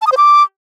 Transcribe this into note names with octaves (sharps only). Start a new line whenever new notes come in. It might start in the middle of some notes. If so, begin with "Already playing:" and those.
A5
D#6
C5
D6